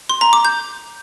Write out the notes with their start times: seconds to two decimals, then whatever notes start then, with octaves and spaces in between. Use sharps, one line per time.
0.09 C6
0.21 A#5
0.33 D6
0.45 G6